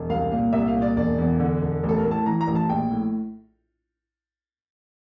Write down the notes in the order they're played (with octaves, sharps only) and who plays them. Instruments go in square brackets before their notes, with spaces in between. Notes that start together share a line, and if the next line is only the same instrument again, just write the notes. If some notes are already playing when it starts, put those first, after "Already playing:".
Already playing: [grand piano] E1
C2 F5
A#2 F5
C2 E5
F5
A#2
D5
E1 D5
E2
D3
E1
A1
A4
A#4
A2
A5
E3 A#5
A#5
A1
A5
A#1 G5
A2